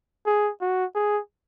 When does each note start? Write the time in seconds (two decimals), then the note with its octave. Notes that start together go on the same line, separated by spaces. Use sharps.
0.26 G#4
0.61 F#4
0.95 G#4